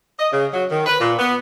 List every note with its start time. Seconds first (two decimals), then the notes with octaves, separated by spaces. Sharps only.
0.19 D#5
0.32 C#3
0.53 F#3
0.70 D#3
0.86 B4
1.00 A#2
1.19 B3